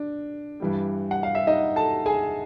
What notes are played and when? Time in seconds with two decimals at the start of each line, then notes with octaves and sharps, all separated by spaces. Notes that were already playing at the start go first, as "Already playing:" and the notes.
Already playing: D4
0.60 G2 E3 G3
1.11 F#5
1.23 F5
1.35 E5
1.47 D#4 D#5
1.76 A4 A5
2.06 G#4 G#5